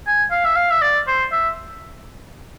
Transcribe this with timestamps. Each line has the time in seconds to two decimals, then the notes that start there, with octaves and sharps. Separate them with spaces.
0.07 G#5
0.31 F5
0.45 E5
0.56 F5
0.71 E5
0.81 D5
1.07 C5
1.32 E5